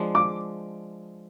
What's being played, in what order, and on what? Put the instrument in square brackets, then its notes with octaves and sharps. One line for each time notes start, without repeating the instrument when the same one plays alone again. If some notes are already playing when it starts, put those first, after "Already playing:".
Already playing: [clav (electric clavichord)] F3 G#3 D4
[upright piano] D6